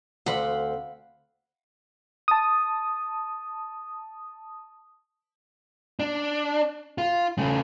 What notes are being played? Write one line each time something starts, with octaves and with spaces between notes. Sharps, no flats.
D2 C4 F5 F#5 B5
A5 D#6
D4
F4
C#3 A3